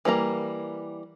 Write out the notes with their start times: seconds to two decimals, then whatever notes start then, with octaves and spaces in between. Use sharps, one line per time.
0.05 E3 G3 A#3 A#5